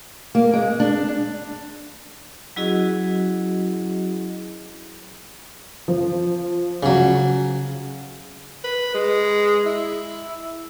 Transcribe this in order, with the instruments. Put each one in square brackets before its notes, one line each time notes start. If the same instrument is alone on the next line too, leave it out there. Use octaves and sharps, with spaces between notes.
[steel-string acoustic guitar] A#3
G#3
D4
[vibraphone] F#3 C#4 E4 F#4 G#4 D#5
[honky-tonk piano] F3
[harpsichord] C#3 F#3
[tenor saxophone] B4
G#3
E4